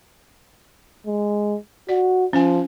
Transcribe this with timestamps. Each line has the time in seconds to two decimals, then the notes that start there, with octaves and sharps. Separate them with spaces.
1.06 G#3
1.89 F#4 D5
2.33 F3 C#4 G#5